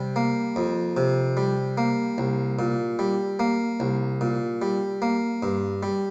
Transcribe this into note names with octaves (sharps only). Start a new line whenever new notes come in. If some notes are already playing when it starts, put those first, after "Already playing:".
Already playing: C3 G3
A#3
F2
C3
G3
A#3
C2
A#2
G3
A#3
C2
A#2
G3
A#3
G2
G3